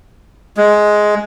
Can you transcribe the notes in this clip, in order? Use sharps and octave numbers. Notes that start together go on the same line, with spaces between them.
G#3